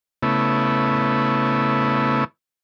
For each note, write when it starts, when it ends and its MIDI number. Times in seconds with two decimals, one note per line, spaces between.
0.23 2.24 49
0.23 2.24 57
0.23 2.24 59
0.23 2.24 64